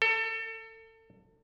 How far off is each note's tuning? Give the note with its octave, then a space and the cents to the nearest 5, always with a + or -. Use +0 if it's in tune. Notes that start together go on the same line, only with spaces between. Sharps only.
A4 +30